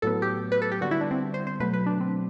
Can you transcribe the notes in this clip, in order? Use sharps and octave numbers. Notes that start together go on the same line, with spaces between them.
A2 F#3 B3 A4
G4
B4
A4
G4
D3 G3 B3 F#4
E4
D4
C4
C5
C5
B2 F#3 A3 B4
B4
D4
C4